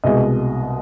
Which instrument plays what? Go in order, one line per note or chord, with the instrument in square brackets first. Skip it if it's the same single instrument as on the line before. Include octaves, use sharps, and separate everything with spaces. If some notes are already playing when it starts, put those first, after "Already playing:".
[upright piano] C2 B2 G#3 D#5